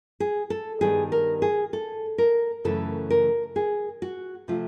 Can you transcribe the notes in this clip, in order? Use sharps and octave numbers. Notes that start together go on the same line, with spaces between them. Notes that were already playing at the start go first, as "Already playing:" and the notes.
G#4
A4
G2 D#3 G3 B3 G#4
A#4
G#4
A4
A#4
F#2 C#3 E3 A3 A4
A#4
G#4
F#4
C3 F3 A3 F4